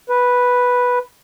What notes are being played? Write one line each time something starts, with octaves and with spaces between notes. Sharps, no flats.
B4